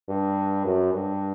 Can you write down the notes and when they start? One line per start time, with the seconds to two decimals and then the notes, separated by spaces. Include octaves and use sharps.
0.09 G2
0.65 F#2
0.94 G2